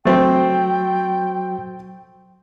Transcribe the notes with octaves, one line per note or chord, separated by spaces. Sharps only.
F#3 A3 C4 F#4 G5